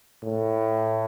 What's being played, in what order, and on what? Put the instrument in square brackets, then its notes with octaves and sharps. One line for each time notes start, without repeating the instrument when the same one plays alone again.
[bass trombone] A2